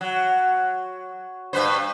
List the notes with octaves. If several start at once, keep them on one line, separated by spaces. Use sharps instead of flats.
F#3
G2 B4 C5